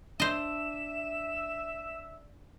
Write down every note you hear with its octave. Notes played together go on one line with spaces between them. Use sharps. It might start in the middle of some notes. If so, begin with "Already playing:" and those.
D4 C5 D#5 E5 E7